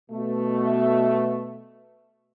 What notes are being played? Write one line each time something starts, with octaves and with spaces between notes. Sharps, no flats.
B2 A3